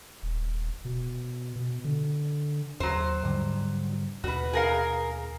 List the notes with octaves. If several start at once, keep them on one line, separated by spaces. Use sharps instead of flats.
D#1
B2
B2
D3
D#2 F#3 C5
G#2 D3 G3
D#2 B2 F#4 B4
G#4 A#4 F5